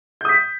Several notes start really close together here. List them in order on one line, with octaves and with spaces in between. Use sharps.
G6 D#6 B6